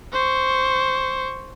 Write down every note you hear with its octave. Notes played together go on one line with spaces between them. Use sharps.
C5 C#6